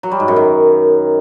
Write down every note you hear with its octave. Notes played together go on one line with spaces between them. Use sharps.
F#3
G3
G#2
F#2
D#3